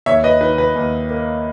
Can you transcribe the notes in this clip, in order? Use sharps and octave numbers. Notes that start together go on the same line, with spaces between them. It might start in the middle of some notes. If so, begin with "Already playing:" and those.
D#2 C#5 E5
B4 D#5
D#3 B4
B4
D#2
A#3